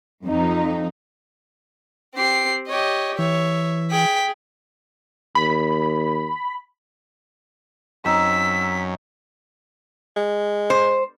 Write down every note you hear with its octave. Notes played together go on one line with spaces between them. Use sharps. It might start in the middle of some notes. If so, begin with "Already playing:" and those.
F2 D#4
C4 G4 C7
G4 C#5 D#5
E3 C#5 E5
G#4 G5 B6
D#2 B5
F#2 C4 D#4 E6 B6
G#3
C5